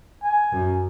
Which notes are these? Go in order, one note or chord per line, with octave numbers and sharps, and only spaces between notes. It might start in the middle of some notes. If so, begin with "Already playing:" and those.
G#5
F#2